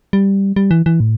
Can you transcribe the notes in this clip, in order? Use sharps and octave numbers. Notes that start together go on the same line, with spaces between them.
G3
G3
E3
E3
A2